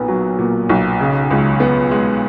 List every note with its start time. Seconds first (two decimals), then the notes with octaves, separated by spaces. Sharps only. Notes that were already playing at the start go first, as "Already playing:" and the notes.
Already playing: B1 A#2 B3
0.08 F#3
0.38 A#2
0.69 B1
0.99 C#3
1.31 C#2
1.60 B3
1.91 G#3